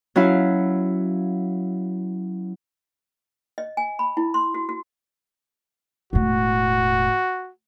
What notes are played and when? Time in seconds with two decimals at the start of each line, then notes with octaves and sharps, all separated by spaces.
0.16 F#3 C#4 E4 F5
3.58 D#5
3.77 G#5
3.99 B5
4.17 E4
4.34 C6
4.54 F#4
4.69 F#4
6.13 E1 A2 F#4